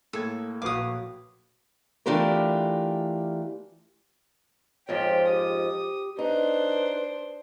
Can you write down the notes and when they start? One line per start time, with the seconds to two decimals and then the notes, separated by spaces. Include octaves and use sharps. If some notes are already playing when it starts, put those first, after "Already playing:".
0.13 A2 A#3 A4 G#6
0.62 A#1 F#4 B4 F5 D6 D#6
2.06 E3 A3 D4 F4 G4 A#4
4.89 F2 G#2 F3 G4 C#5
5.29 G4 D#6
6.19 D4 D#4 B4 C5